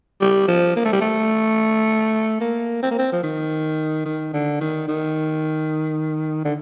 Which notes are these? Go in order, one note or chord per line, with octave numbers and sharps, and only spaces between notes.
G3
F3
A#3
A3
G3
A3
A#3
C4
A#3
C4
F3
D#3
D#3
D3
D#3
D#3
D3